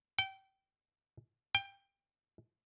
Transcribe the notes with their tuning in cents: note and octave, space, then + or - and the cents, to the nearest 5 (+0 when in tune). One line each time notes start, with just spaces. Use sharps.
G5 -25
G5 +15